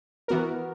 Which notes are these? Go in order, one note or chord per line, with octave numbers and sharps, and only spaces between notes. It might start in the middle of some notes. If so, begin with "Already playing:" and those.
E3 B3 F#4 A#4